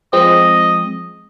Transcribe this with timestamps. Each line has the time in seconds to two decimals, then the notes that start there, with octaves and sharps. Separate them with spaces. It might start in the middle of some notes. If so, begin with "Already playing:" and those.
0.13 F3 G#3 C4 D#5